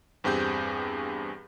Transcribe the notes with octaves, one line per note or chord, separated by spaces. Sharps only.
E2 G2 C4 G4 G#4 G6